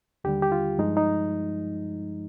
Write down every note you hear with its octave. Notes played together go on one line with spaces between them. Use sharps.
D#2 D3 G3 G4
G4
F4
G2 F3 G#3 D#4
D#4